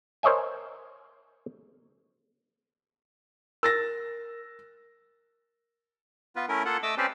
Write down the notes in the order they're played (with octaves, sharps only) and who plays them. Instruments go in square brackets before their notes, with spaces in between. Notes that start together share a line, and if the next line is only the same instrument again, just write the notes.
[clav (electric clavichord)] A#4 C5 C#5 D#5 E5 G#5
[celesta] A#4 [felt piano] E6 A6 A#6
[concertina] B3 F4 B4
A3 C#4 E4 A#4
A#3 F4 A4 F#5
A3 D#5 D6 E6
C4 C#4 G4 B4 C5 D5